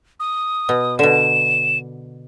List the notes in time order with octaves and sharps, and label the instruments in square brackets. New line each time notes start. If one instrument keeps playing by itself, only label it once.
[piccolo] D#6
[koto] B2
[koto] B2 D3 [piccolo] E7